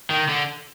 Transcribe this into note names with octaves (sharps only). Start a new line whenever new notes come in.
D#3
D3